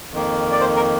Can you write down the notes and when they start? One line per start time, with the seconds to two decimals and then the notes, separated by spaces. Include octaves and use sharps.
0.12 F2 D#3 A#3
0.52 D5
0.60 C5
0.76 A#4